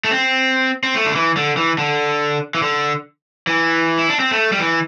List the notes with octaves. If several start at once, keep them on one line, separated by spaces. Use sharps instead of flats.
A3
C4
C4
A3
D3
E3
D3
E3
D3
E3
D3
E3
E4
D4
C4
A3
G3
E3